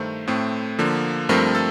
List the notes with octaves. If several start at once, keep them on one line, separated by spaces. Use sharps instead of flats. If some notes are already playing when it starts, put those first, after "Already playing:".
Already playing: G2 D#3 A3 C5
A2 A3 C4
D3 F3 A#3
G2 F3 A3 C4 A#4
A4